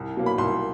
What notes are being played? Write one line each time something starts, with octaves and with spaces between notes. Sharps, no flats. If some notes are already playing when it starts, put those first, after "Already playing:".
Already playing: C2
B2 F#3 A#3
B5
C2 C6